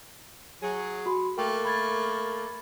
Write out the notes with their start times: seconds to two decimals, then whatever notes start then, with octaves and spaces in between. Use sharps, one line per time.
0.62 F#3 G#4
1.06 F#4 B5 C6
1.38 A3 A#3 A#4 G5
1.65 B5 G#6 A6